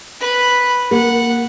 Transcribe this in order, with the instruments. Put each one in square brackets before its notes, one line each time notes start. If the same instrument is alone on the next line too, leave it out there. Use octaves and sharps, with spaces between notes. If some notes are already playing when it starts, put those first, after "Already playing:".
[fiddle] B4 B5
[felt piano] A#3 [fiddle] F#5